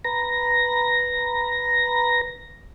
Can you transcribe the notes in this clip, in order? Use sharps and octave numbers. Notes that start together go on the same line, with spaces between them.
B4 A#5 A#6